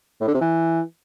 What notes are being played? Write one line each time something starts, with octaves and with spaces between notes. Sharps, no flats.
A2
D3
C3
E3